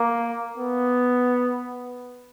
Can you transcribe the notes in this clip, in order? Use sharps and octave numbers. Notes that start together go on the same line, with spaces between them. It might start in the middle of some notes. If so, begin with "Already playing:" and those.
Already playing: A#3
B3